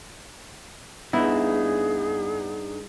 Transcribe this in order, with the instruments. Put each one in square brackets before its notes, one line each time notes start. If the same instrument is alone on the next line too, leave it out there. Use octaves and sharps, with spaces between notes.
[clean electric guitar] G2 D#4 [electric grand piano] B3 [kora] E4 [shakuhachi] G#4